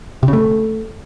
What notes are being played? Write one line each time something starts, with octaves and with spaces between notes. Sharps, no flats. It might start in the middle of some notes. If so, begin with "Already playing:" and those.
C3
C#3
A3